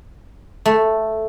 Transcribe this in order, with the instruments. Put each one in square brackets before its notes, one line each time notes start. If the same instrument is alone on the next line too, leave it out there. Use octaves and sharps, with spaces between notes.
[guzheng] A3